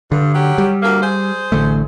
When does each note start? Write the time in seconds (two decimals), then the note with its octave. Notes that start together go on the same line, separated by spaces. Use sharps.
0.12 G2 D3
0.34 F#3 C#4 G4
0.58 G3
0.83 D2 A#3
1.02 G#4 C5
1.52 A1 D3 A3